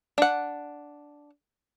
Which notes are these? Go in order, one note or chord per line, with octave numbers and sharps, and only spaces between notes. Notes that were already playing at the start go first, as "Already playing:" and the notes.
D4 F#5